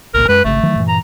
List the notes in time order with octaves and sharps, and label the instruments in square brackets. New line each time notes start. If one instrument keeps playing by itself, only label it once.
[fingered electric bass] G#1 C#2 A#2 [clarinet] A#4
[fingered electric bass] F#2 G#3 [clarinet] B4
[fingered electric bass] G#1 C#3 [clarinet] A3
[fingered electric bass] D#3 E3 F#3
G2 A#2 E3
[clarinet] A#5